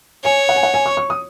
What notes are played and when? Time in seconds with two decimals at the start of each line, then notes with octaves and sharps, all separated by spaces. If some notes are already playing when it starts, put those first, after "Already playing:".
0.24 C#5 G#5
0.49 F#5
0.56 G#5
0.63 F#5
0.74 G#5
0.86 C#6
0.97 C#6
1.10 D#6